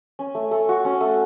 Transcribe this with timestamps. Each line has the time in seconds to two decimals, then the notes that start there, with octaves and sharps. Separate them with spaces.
0.19 C#4
0.35 A3
0.51 A3
0.69 F#4
0.85 C#4
1.01 A3